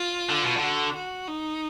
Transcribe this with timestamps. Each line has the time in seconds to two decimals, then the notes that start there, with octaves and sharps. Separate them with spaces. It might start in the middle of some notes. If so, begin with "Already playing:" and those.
Already playing: F4
0.29 D3
0.43 B2
0.57 D3
0.62 F#4
0.95 F#4
1.27 D#4